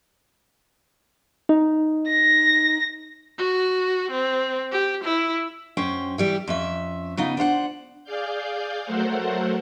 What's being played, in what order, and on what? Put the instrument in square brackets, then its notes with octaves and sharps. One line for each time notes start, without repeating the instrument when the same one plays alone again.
[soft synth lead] D#4
[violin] A#6
[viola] F#4
C4
G4
E4
[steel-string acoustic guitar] F#2 C#4 C5 G5
E3 G3 G4
F2 C#4 E5
C#3 B3 D#4 F4
D4 C5 F5 F#5
[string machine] G#4 D5 F5 G6
F#3 A3 A4 A#4 C5 F#5